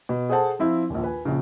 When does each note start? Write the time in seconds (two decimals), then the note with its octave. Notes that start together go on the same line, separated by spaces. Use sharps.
0.09 B2
0.30 G#4 A4 C5 F#5 A5
0.59 F3 C4 E4 F4
0.90 A#1 D#2
1.04 B4 G#5
1.25 A#1 C#3